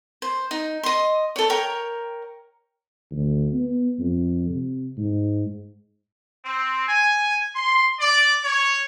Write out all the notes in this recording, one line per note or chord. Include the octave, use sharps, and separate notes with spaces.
C5
D#4
D#5 C6
A4 C#5
A#4 C#5 G5
D2
B3
F2
C3
G#2
C4
G#5
C6
D5
C#5